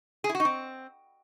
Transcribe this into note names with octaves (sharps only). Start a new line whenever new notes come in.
G#4
E4
F#4
D#4
C4